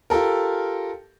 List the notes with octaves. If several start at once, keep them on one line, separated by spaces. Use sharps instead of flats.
F4 G4 A4 A#4